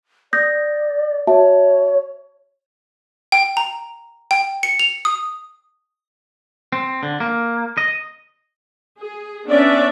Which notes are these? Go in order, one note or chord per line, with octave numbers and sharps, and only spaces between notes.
D5 D#6 G6 A#6
F#4 C#5 E5 A5
G5
A#5
G5
C#7
F7
D#6
C4
D3
A#3
D#5
G#4
B3 C#4 D4 D5 E5